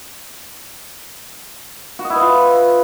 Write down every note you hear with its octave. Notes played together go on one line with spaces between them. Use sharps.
F#4
D#5
E4
B4
F4